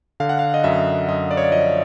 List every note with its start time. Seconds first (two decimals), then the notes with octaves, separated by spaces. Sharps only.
0.20 D3 F5
0.29 F#5
0.39 F5
0.54 D#5
0.64 F#2 E5
1.08 F#2 D#5
1.31 D5
1.37 C#5
1.44 D5
1.52 F3 D#5